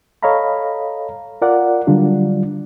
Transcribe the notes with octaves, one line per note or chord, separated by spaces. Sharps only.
A4 C#5 D#5 F5 A#5 B5
F4 A#4 D5 F#5
D3 F#3 G3 D4 F4